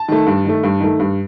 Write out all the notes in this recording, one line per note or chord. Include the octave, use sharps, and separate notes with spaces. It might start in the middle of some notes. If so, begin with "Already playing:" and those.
Already playing: A5
D#3 A3
G2
D#3 A3
G2
D#3 A3
G2